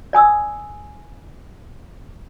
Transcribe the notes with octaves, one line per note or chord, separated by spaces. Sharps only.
D5 G#5 D#6 E6